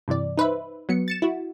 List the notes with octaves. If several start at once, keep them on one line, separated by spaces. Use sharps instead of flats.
G2 C3 E3 D5
D#4 B4 C5 E5
F#3 B3 C#7
A6 C#7 E7
E4 F#4